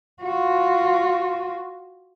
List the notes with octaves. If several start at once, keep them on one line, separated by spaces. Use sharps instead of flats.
F4 F#4